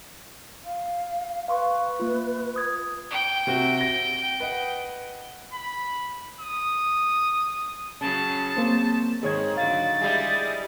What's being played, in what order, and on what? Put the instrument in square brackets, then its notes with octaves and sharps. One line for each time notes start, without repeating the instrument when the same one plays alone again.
[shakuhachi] F5
[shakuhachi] B4 [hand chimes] F5 C6 C#6
[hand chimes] A#3 F4
D#6 G#6
[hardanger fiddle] G5
[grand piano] C3 C4 F#4
A#6
B4 D#5 F#5
[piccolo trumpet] B5
D#6
[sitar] C#3 [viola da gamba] F#3 C#4 [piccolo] A5
[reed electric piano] A#3 C4 [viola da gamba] C5
[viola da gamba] G#2 [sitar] D#3 [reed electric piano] G#4 C#5 G#6
[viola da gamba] D3 F#3 F#4 [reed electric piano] F5 [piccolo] A6
[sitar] G3 G#3 [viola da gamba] E4 G#4